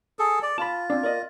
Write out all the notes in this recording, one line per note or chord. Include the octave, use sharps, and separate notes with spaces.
G#4 A4
D5
F4 A5 B5
C4 D4
A#4 D5 D#5